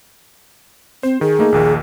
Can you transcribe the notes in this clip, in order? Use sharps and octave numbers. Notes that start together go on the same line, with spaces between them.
C4 C5
D#3 G#4
A3 A#3 D#4
A#1 D#2 D#3